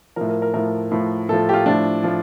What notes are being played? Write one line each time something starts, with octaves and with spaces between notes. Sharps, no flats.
A2 F3 A#4
A#4
A#4
A2 F3 A#4
A2 F3
A2 F3 A4
G4
F4
A2 F3 D4
A2 F3